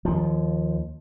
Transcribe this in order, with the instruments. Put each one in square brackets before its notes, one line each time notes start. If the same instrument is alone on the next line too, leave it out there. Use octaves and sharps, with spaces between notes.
[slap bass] D#2 F3